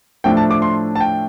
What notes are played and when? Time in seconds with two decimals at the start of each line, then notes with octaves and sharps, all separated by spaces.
0.24 A2 F3 A3 D4 G5
0.37 A5
0.51 D6
0.62 C6
0.96 A5
1.01 G5